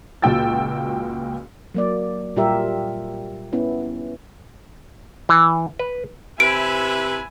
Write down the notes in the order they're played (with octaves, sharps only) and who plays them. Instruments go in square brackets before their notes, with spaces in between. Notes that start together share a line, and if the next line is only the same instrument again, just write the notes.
[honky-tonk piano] C#2 A#2 F#4 G5 E6 A6
[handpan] F#3 A#3 D5
A#2 G3 F4 G4 A#4 E5
B3 C#4 E4
[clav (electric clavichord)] E3
B4
[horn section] C3 B4 E5 [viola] E4 G#5 [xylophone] D7